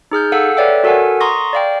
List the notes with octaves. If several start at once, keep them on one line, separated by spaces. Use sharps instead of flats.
D#4 G#4 F6 G6
A4 F5 F#5 E6 C#7
A4 B4 C#5 D5 E5 G5
F#4 A4 A#4 F#5 G#5
A#5 C6 C#6 D#6 A#6
D5 F5 G5